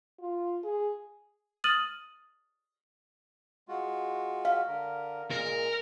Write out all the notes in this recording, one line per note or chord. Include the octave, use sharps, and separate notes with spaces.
F4
G#4
D#6 F6 A6 D#7 F#7
G#3 F4 F#4
F5
D3 A#4
A#2 G#3 A#4